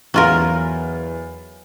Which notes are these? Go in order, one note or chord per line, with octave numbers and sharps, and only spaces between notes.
E2 F#3 F4 A#4